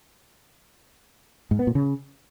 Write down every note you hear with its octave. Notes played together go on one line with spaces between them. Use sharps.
G#2
B3
A#2
C#3